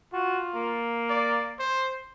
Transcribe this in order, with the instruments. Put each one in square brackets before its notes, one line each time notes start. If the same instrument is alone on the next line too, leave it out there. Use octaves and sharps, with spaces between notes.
[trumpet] F4 [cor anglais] F#4
[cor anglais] A#3
[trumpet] D5
C5